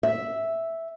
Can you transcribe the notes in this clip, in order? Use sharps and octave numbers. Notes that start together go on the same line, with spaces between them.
E5